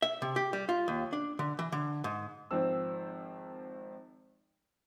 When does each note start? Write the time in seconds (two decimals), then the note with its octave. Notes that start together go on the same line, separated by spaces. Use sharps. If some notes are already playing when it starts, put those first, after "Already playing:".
0.02 E5
0.22 C3
0.36 G4
0.53 G3
0.69 F4
0.88 D#2
1.13 D4
1.39 D3
1.59 E3
1.72 D3
2.04 G#2
2.51 G#1 D#3 F3 C4 E6